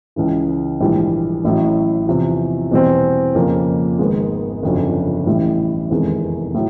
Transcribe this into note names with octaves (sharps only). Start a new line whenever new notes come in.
C#2 C#3 E3
A#1 G#2 E3 G3
A1 A2 F#3
E2 C3 F3
E2 B2 G3 C4
F2 C#3 F3 A#3
G#1 G#2 D#3 G#3 B3
G1 F2 C#3 F#3
A1 A2 E3 G3
F1 E2 C3 D#3 G#3
A2 F#3